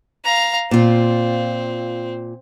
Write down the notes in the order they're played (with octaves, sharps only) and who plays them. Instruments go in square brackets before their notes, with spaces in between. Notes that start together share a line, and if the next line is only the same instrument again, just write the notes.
[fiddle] F5 A#5
[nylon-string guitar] A#2 F4 [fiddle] C4